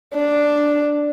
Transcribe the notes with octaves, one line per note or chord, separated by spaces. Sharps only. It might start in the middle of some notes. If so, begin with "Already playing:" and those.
D4